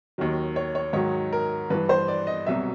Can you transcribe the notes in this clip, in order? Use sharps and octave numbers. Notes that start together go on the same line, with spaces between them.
D#2 D#3 F#3
C#5
C#5
G#2 D#3 F#3 C#5
A#4
G2 E3 B4
C5
D5
D#5
C2 B2 F#3 E5